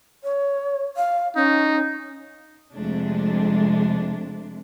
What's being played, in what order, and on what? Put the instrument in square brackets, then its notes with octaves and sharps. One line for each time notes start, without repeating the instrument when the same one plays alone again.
[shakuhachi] C#5
F5
[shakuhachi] C#4 [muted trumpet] D#4
[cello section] F2 C3 G#3 A3 D4